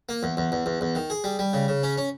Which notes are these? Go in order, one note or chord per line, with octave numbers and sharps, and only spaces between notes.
A#3
E2
E2
E2
E2
E2
D#3
G#4
G3
G3
C#3
C#3
C#4
C#4